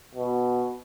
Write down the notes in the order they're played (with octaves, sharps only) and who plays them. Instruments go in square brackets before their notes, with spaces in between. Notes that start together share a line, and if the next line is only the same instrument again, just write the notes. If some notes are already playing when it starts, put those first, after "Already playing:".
[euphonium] B2